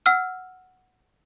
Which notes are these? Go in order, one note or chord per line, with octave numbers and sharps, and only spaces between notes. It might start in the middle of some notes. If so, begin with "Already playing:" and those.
F#5 E6 F6